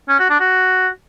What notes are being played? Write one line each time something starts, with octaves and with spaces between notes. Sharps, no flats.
C#4
F#4
D4
F#4